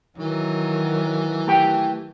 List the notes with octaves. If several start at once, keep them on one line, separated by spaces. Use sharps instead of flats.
D#3 E3 F#3
A3 G4 G5